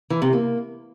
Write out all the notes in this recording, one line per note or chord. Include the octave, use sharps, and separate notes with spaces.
E3
C3
A#3